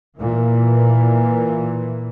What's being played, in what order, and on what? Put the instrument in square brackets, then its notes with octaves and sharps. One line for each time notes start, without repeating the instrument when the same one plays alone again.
[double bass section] A#2 E3